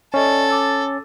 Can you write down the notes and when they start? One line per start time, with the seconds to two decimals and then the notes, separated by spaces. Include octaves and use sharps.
0.14 C#4 A4 D5 D#5 C#6
0.49 D6 E6 A6